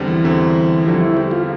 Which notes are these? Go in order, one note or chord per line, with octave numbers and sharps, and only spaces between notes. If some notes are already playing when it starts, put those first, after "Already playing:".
Already playing: E2 D3 G3 C4
E3
E2 D3 G3 C4
E2 D3 F3 G3 C4
E4
G4
F4